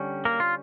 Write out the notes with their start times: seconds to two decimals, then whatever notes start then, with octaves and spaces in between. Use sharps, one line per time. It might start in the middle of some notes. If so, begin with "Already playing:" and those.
Already playing: D3 G3 C#4
0.25 A#3 A#4
0.40 F4